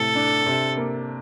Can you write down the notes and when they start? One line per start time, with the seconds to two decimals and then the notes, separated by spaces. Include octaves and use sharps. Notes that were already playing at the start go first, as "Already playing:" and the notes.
Already playing: A2 C3 A4
0.15 D4
0.46 C3
0.77 A#3